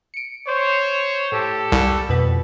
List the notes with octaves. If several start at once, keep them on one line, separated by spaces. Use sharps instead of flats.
C#7 D7
C5 C#5
A2 G4 A4
C2
F2 B2 B4